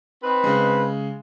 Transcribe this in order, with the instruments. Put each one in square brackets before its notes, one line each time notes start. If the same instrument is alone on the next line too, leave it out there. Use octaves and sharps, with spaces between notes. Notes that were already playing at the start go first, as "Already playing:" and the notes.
[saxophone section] C4 D#4 B4
[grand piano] C#3 G#3